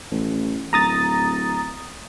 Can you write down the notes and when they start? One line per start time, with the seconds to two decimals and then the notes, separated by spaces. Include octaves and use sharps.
0.11 A1
0.73 D1 A#5 D#6 A6